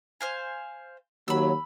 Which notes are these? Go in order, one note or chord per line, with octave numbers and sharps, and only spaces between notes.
C5 F5 G#5
D#2 F#3 B5 E6